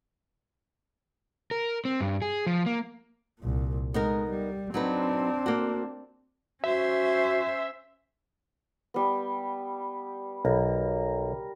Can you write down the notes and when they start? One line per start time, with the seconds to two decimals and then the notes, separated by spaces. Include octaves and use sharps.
1.51 A#4
1.85 C4
2.00 G2
2.22 G#4
2.47 F3
2.66 A#3
3.39 C2 A#2
3.94 G#3 B3 D#4 A#4
4.30 G3
4.74 F#3 C4 D4 D#4 B4
5.46 A#3 F#4
6.64 C#4 F#4 C5 E5
8.94 G3 B3
10.45 B1 A#4